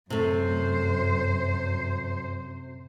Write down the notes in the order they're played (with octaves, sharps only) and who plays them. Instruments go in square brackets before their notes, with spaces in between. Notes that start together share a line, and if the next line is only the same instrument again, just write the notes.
[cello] F#2 C5 [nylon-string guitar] C3 A3